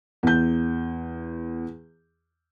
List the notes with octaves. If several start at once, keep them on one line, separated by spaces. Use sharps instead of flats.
E2 G6